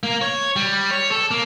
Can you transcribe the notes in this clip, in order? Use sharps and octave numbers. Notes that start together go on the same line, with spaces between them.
A#3
C#5
G3
C#5
A4
A#3